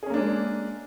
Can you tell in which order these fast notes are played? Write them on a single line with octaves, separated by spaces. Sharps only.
G#4 C#4 A#3 D4 G#3